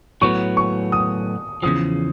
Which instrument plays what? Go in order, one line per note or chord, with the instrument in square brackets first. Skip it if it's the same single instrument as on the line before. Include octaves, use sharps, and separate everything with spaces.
[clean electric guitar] A2 F#3 B3 [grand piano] C#6
[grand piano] C#6
D#6
[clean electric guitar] E2 C#3 F3 [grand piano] D#6